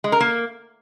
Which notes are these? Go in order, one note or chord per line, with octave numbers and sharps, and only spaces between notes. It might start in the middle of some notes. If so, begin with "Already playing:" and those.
G#3
A#4
A#3